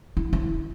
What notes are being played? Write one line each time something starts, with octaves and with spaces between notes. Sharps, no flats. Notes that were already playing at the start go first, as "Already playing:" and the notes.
E4
E4